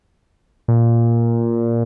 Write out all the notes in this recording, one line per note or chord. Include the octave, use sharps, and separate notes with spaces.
A#2